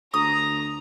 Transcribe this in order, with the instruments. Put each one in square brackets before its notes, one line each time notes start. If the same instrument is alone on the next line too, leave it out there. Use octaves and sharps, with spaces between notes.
[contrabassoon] D2 [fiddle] A#5 [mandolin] D#6